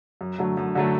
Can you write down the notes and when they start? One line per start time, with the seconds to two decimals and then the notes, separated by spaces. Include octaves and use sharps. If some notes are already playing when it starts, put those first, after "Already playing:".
0.21 F#2
0.38 D3 F#3 A3
0.57 F#2
0.75 D3 F#3 A3